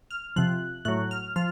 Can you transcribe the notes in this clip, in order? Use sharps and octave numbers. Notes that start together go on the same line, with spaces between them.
F6
C3 F3 F#6
A2 F#3 F#6
F6
F3 F6